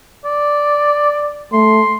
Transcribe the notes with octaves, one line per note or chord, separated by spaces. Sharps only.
D5
A3 C6